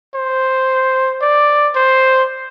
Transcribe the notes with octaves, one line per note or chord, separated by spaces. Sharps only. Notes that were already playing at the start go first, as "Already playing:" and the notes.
C5
D5
C5